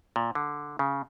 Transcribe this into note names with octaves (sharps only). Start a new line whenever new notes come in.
A#2
D3
C#3